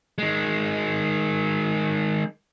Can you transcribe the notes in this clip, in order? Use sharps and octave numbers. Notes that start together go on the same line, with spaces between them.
D#3 G#3